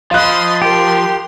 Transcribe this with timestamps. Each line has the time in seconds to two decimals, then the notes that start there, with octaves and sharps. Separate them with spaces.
0.11 F3 D#5 F5 B5 C6 F#6
0.62 G4 A#4 C6